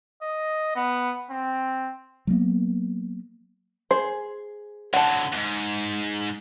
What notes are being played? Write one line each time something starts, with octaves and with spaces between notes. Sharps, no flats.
D#5
B3
C4
F#3 G3 A#3 B3
G#4 C5
D3 F#3 F#5 A5
D#2 G#2